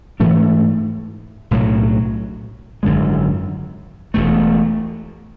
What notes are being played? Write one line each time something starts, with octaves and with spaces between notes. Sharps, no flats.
G#2 E3 A3 D4
B1 A2 F#3
G#1 F#2 D3 G#3
E1 E2 B2 A3